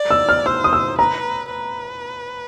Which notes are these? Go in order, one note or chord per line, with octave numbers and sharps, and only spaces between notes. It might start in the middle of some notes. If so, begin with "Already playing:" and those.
Already playing: D5
E6
F6
C5 E6
D#6
E6
B4 A#5
B4